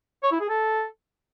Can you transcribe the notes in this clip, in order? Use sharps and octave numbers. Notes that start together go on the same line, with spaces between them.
C#5
E4
G#4
A4